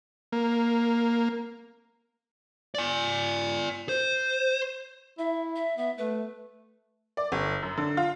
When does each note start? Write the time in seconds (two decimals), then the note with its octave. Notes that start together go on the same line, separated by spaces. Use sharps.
0.32 A#3
2.75 D5 G#5
3.89 C5
5.19 E4 E5
5.56 E5
5.78 B3 E5
5.98 A3 B4
7.17 D5
7.32 G1
7.63 F#2
7.77 D3
7.97 F4